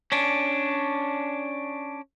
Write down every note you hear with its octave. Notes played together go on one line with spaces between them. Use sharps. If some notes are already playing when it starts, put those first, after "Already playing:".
C#4 D4